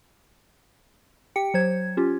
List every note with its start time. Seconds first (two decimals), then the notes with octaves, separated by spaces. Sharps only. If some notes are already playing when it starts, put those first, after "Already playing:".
1.36 G4 G5 C#7
1.54 F#3 C5 G#6
1.97 C#4 F4 G4